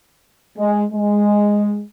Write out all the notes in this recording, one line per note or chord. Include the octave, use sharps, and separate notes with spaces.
G#3
G#3